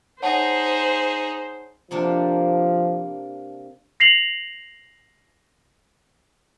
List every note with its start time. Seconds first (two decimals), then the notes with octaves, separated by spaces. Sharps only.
0.22 D#4 G#4 C5 C#5 F#5 A5
1.91 C3 F3 A#3 D4
4.00 A#6 C7 F7 F#7